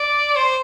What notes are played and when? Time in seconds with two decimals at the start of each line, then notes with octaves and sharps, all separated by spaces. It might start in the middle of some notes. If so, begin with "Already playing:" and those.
Already playing: D5
0.36 C5